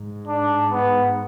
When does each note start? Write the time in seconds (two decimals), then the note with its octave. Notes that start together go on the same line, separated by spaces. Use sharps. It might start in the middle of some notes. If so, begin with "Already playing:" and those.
Already playing: G#2
0.28 D4
0.71 B3